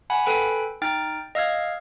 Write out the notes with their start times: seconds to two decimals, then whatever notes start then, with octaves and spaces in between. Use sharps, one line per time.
0.10 F#5 G#5 B5
0.25 A4 B4 G5 G#5 B5
0.82 D#4 G5 F6 A6
1.35 D#5 F5 E6 F6 G#6